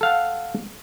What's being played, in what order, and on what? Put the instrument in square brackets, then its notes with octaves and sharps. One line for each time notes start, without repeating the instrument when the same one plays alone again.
[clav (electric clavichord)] A4 F5 F#5